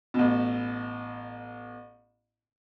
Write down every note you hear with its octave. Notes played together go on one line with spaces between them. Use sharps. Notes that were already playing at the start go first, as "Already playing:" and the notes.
A1 B2